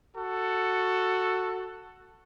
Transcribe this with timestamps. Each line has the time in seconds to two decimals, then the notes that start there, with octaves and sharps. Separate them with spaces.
0.16 F#4 A4